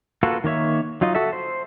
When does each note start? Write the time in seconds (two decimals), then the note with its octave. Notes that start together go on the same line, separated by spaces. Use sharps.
0.23 A#3 F4 F#4 A4 B4
0.44 D#3 A#3 C#5 E5
1.01 F#3 D#4 F4 D#5
1.15 F#4 A4 E5
1.33 C5